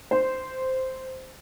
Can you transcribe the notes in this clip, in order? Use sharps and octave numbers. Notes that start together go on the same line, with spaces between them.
C5